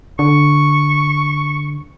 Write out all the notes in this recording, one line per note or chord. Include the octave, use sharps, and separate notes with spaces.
D3 C#6